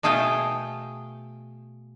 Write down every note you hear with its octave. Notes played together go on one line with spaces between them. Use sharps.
B2 A3 G#4 F5 G5